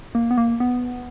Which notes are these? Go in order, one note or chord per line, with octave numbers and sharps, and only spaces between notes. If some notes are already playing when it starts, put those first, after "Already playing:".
A#3
B3
A#3
B3